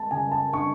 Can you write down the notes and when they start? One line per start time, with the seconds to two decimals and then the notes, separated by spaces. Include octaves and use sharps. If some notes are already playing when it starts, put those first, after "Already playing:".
Already playing: G#3 A5
0.11 C#3 G#5
0.32 A5
0.53 D4 C#6